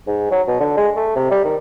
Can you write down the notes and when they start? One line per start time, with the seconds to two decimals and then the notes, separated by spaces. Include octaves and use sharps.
0.07 G#2
0.31 F#3
0.48 B2
0.60 D3
0.77 G#3
0.96 A3
1.16 C3
1.31 G3
1.44 D#3